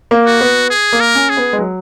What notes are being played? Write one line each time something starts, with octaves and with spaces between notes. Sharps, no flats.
A#3
F#4
B3
G#4
A#3
A#4
C#4
G#4
B3
G#3
F#3